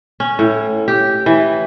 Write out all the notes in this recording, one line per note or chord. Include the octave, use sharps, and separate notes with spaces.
C#4
A2
G4
E3